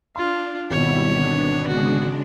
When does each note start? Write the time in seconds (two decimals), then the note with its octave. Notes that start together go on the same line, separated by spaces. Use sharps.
0.16 D4 F4 C6
0.71 G#1 B2 G3 E4 C#5
1.13 D3 B3 D4
1.67 C#3 G#3 D4 F#4